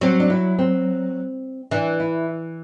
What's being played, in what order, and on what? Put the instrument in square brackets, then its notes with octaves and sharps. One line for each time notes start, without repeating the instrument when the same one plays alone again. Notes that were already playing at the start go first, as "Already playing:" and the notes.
[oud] F#3 [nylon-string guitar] C4
[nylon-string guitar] D4
E4
C4
[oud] E3 [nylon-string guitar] D4
[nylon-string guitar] E4